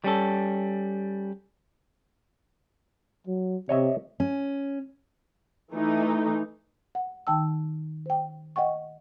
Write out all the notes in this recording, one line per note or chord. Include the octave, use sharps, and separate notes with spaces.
G3 C#4 A4
F#3
C3 C#5 D#5 E5
C#4
E3 A3 D#4
F#5
D#3 D#4 G5 A5 E6
C5 G5
D#5 F#5 G5 C#6